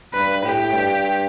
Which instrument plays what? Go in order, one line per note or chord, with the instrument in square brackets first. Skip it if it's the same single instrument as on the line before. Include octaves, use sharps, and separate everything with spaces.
[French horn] G2 [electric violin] B4
[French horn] A2 [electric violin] G4
[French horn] G2